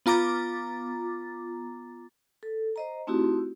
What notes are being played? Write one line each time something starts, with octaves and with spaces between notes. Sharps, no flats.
B3 F4 A#5 D6 A6
A4
C5 D#5 A#5
A3 C4 D#4 E4 F#4 G4